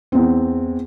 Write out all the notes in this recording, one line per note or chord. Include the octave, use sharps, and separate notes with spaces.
E2 C4